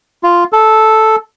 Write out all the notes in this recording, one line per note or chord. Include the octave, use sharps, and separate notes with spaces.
F4
A4